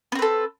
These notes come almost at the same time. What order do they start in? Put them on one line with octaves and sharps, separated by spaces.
B3 C4 B4 A4